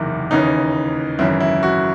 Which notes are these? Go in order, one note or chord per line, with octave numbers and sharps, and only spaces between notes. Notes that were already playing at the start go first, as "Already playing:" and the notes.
Already playing: F#1 E2 C3 D#3 E4
D#2 C#3 E3 D#4
G#1 F#2 C#3 E3 E4
E4
F#4